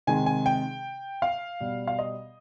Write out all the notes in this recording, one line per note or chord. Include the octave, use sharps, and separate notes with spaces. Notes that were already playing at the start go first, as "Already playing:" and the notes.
C3 D#3 G#3 G#5
G#5
G5
F5
B2 G3
F5
D#5